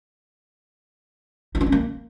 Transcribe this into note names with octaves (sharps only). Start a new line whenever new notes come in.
D#4
D4
C#4
A#3